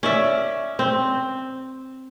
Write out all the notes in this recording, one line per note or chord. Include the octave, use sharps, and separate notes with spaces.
C#4 D5 E5
C4